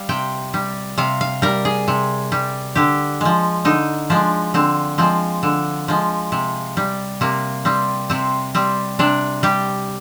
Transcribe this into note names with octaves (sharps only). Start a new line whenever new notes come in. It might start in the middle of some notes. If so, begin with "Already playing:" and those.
Already playing: G3 F5
C3 G5
G3
C3 F5
F5
G3 A#4
G#4
C3
G3
D3 G4
F3 G#3
D3 D#4
F3 G#3 D4
D3 C4
F3 G#3 C4
D3
F3 G#3
C3
G3
C3 A#3
G3 C4
C3 C4
G3 C4
C3 D4
G3 G4